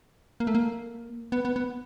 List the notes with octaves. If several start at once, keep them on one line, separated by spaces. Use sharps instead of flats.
A#3
A3
A#3
B3
B3
B3